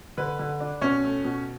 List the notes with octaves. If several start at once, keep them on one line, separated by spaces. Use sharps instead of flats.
D3 B4
D3
D4
B2 C#4 C#5
A3
B2